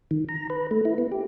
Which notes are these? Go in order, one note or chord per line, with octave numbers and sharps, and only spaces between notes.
D#3
A#5
B4
A3
E4
B3
G4